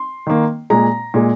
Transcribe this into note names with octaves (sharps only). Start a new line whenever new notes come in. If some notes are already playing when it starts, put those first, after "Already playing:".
Already playing: C6
D#3 A#3
A#2 G#3 A#5
A#2 G#3